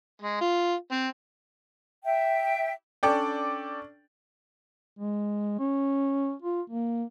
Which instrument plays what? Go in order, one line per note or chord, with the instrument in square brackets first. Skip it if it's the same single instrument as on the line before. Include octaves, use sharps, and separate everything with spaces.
[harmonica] G#3
F4
C4
[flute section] E5 G5
[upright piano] C#4 D4 A4 D5 G5
[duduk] G#3
C#4
F4
A#3